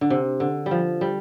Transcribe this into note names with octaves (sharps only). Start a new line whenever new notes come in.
D3
C3
D3
G3
F3
G3